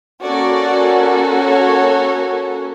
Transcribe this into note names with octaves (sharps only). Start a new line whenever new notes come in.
A#3 C#4 F#4 A4 D5
C#5